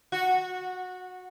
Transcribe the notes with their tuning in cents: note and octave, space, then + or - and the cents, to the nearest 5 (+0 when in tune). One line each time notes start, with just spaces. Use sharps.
F#4 -15